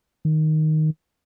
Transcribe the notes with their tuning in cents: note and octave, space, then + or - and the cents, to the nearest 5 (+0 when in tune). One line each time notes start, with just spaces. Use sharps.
D#3 +0